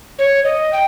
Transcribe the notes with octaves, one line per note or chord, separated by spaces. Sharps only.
C#5
D#5
G5